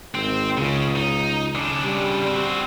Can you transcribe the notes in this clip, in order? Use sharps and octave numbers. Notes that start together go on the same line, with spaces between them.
G#1 C4
C#2 C#3
D#4
C#3 D4
G3
C4 F#4